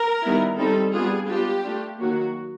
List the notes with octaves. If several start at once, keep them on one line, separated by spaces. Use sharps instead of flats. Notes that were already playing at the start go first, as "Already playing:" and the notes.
Already playing: A#4
D#3 G3 B3 E4
G3 C4 D#4 A4
G3 B3 D4 F4 G#4
G#3 B3 D4 F4 G4
A3 D4 F4
D#3 F#3 A#3 F#4